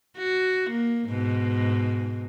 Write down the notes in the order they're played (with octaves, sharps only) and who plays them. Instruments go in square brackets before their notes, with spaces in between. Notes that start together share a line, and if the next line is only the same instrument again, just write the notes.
[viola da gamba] F#4
A#3
G#2 B2